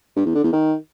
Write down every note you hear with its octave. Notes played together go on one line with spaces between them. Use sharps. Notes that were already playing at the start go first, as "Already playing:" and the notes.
G2
E2
D3
E2
D#3